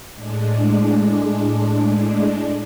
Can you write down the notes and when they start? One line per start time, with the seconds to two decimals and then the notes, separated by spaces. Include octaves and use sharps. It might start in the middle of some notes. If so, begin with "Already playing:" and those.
0.14 A2 G#3 D4